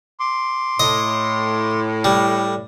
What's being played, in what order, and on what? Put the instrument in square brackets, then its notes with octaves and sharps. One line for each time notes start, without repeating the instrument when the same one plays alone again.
[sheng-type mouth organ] C6 D6
[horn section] A2 [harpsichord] D#5
[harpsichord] G3